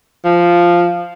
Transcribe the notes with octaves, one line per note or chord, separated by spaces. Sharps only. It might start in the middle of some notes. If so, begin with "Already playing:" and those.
F3